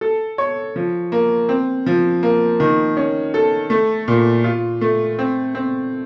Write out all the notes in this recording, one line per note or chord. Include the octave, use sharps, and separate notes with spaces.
A4
C#5
F3
A#3
C4
F3
A#3
D#3
C#4
A4
A3
A#2
F4
A3
C4
C4